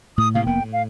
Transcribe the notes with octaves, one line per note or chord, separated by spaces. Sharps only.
A2 D#6
A2 C3 A#3 F5
F1 A#3 B3 G5
A2
F5